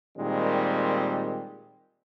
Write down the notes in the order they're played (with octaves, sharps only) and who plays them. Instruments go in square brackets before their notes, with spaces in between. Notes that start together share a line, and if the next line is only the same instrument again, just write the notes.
[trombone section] A#2 D#3 G3 G#3 C4